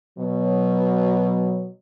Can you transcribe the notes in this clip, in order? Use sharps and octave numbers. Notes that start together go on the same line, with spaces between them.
B2 F#3